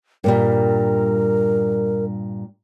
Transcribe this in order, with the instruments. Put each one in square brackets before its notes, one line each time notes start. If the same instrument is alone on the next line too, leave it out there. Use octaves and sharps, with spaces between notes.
[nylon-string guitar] G2 A#2 G3 [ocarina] A#4